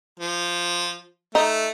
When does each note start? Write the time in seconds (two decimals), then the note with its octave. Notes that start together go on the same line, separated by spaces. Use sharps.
0.20 F3
1.35 A3 D#4